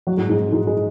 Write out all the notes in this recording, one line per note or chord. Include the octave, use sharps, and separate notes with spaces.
F#3 F#4
G#2 G#3
G#2 G#3
G#2 G#3
G#3